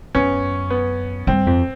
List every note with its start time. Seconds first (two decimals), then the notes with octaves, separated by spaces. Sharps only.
0.15 F#2 B3 C#4
0.70 B3
1.27 G2 C4
1.46 F2